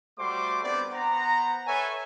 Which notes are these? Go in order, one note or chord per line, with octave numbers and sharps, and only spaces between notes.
G3 A3 F#4 C5 C6 D6
G3 B3 C4 D4 C5 D5
B3 C5 F#5 A#5
A4 B4 C#5 E5 G#5